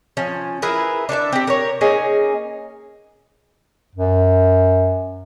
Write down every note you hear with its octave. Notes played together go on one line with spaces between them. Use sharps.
F3 C#4
E4 G#4 A#4 B4
D4 A4 C5 E5
C4 G4
A#4 C#5
A#3 C#4 D#4 G#4
F#2